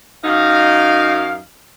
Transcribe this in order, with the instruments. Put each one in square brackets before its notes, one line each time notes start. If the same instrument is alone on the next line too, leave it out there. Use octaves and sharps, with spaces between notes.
[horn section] F#2 D#4 F5